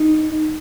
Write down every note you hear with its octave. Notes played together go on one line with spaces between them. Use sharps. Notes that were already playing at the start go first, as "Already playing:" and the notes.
Already playing: D#4